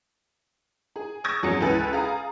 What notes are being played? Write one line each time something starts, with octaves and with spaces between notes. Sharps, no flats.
G#4
C#6 D#6 E6 G#6 A#6
E2 F#3 C#4 G#4 C#7
C#2 E4 A4 B4 G#5 A6
G#4 F5 A#5 D#6